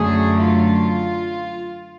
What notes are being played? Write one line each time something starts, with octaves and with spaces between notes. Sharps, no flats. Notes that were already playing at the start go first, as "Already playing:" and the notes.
Already playing: F#2 D3 F#3 A3 G#4
F4